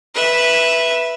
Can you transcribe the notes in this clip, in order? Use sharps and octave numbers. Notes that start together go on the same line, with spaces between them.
B4 E5